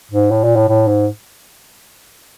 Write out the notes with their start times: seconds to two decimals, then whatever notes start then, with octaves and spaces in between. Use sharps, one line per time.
0.11 G#2
0.31 A2
0.44 A#2
0.56 A2
0.68 A2
0.88 G#2